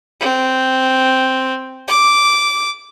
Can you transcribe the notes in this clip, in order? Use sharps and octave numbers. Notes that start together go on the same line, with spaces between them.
C4
D6